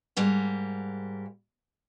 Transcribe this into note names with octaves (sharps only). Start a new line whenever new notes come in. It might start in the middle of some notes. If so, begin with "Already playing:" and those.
G#2 G3 A#3